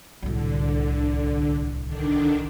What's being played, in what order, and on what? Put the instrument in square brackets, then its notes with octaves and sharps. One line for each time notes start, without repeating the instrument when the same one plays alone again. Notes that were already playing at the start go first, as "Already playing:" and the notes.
[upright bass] D1 C2 [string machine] D3
[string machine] D3 D#3 D4